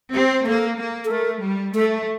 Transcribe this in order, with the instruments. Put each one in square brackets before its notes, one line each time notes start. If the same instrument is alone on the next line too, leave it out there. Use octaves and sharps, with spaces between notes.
[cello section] C4 [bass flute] G4
[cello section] A#3 [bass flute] A4
[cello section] A#3
[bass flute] A4
[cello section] A3 [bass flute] A#4
[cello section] G3
[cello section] A3 [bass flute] A4